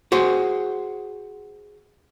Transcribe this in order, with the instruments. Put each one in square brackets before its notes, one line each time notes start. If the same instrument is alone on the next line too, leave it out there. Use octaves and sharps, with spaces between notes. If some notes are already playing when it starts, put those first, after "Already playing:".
[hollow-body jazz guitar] F#4 G#4 C5